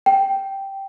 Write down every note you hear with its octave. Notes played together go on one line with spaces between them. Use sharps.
G5